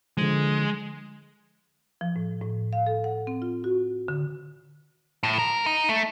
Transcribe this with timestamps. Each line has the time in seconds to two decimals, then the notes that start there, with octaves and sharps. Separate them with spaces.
0.17 D3 F3 G#3
2.01 F3
2.16 A2
2.42 A2
2.73 F5
2.87 A4
3.04 F#5
3.27 C4
3.42 F4
3.64 F#4
4.08 D3
5.23 A2
5.38 A#4
5.66 D#4
5.89 A3